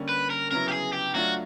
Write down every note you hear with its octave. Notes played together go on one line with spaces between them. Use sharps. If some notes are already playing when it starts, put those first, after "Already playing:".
Already playing: D3 G3 A#3 C#4
B4
A#4
C#3 F#3 B3 E4 A#4
G4
G#4
G4
F#3 A3 D4 F4 F#4